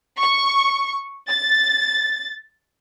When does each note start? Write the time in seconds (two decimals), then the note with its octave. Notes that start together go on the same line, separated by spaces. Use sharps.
0.19 C#6
1.30 A6